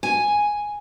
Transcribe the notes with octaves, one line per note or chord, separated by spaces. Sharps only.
G#5